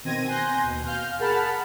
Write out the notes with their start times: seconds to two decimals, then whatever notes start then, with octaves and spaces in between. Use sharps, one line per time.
0.04 B2 D#3 C4 G#6 A#6 D#7
0.27 G#5 C6 F#6 G6 A#6
0.63 D#2 B2
0.86 F5 F6 G6
1.19 G#4 A#4 F#5 A5 B5 F6